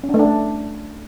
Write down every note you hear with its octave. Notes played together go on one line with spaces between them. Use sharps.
C#4
D4
A3
D4
A3